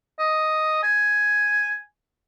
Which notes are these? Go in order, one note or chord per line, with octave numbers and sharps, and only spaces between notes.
D#5
G#5